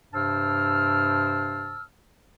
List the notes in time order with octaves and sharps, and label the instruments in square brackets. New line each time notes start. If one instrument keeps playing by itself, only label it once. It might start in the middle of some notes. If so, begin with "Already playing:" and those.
[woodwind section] G2 C3 C5 A5 E6 F6